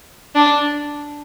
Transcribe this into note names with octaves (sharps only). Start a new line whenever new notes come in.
D4